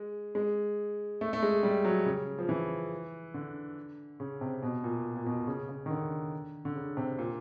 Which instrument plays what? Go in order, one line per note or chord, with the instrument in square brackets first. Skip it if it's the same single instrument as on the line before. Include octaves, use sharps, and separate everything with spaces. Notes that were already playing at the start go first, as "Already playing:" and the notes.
Already playing: [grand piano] G#3
G#3
A3
A3
G#3
G3
F#3
C#3
F3
E3
D3
C#3
C3
B2
A#2
A#2
B2
C#3
C#3
D#3
D3
D3
C#3
C3
A#2